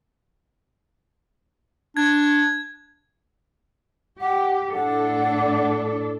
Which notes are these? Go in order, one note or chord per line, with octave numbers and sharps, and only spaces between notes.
D4 G#6
G4 F#5
A2 D4 A4 F#5